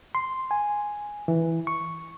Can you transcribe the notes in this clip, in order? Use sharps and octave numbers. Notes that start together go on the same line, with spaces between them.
C6
G#5
E3
C#6